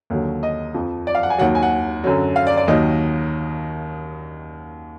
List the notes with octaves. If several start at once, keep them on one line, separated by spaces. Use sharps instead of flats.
D#2 D3 F#3
D#5
F2 F3
D5
F5
F#5
G#5
D#2 D#3 F#3 F#5
G#5
F#5
F#2 D3 F#3
F5
D5
D5
D#2 D#3 F#3 D#5